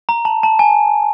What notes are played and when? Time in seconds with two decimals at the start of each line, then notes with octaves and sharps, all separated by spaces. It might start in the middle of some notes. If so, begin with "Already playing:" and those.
0.09 A#5
0.25 A5
0.43 A5
0.59 G#5